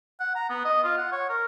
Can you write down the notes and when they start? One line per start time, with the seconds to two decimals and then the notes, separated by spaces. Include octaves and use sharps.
0.20 F#5
0.35 A#5
0.50 B3
0.65 D#5
0.84 F4
0.97 F#5
1.12 C#5
1.29 A#4